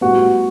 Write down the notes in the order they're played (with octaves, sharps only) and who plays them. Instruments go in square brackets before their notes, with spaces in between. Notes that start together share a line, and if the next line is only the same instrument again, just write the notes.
[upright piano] A2 G3 B3 F#4